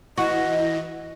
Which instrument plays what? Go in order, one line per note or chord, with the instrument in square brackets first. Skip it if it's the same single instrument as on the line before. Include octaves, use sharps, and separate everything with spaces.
[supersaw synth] E3 [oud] F#4 [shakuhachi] D#5